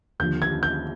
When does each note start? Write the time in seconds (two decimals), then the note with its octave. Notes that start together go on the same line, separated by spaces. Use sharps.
0.19 D#2 D3 F3 G6
0.42 G#6
0.63 G6